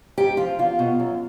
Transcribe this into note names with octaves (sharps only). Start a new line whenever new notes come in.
G#2 G4
F3 F4
E2 F4
B2
F#2